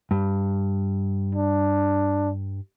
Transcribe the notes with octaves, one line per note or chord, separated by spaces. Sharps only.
G2
D4